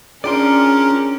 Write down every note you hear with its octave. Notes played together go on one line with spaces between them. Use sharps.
C#4 D4 F4 G#4 A#4 D5 G5 C6